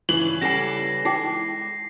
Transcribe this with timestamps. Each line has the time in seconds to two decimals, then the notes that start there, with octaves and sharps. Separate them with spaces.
0.09 G2 C#3 E3 F#7
0.41 C#3 G3 C#4 A4 G#5 A#6 C7
1.05 G#3 D#4 G#4 G5 C7